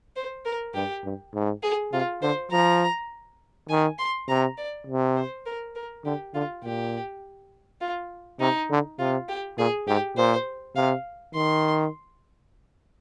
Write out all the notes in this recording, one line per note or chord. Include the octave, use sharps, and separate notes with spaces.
C5
A#4
G2 G4
G2
G#2
G#4
C3 F4
D3 C5
F3 A#5
D#3 G#5
C6
C3 A#5
D5
C3
C5
A#4
A#4
D3 G4
D3 F4
A#2 G4
F4
C3 D#4
D3
C3 F4
G4
A#2 G#4
G#2 G4
A#2 C5
C3 F5
D#3 C6